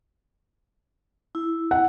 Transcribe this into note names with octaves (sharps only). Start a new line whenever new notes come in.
E4
F#5